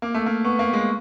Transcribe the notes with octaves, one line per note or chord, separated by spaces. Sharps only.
A#3 D6
A3
A#3
B3 C#6
A#3
G#3